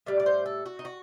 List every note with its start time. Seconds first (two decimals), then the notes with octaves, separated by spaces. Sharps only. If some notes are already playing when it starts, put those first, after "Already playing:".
0.06 A2 G3 D5
0.20 D5
0.26 C5
0.46 A4
0.66 F#4
0.79 D#4
0.85 F#4